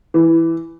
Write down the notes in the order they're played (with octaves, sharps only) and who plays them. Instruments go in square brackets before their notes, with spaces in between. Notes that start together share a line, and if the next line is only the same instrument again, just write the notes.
[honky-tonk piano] E3